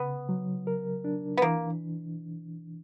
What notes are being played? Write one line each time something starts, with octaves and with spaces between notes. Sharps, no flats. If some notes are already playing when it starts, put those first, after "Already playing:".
Already playing: C#3 B3
F#3
A#4
D4
B3
E3 A#3